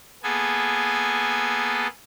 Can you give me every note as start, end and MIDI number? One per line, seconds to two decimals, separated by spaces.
0.23 1.87 58
0.23 1.87 59
0.23 1.87 68
0.23 1.87 69
0.23 1.87 80